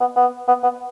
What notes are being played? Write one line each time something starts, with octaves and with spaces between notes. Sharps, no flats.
B3
B3
B3
B3